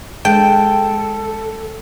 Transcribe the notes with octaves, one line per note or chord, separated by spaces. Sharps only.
G#3 A4 G5 A5